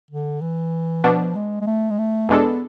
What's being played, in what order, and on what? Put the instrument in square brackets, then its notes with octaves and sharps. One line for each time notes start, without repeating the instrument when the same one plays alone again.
[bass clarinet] D3
E3
[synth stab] B2 B3 D4 [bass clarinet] F3
[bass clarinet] G#3
G#3
A3
G#3
A3
[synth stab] E2 B2 G#3 D4 A4 [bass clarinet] B3